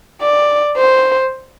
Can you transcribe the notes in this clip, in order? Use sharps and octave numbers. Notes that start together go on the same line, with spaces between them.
D5
C5